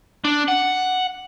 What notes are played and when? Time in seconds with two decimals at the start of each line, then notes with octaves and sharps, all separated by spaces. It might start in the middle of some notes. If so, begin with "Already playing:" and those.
0.25 D4
0.48 F#5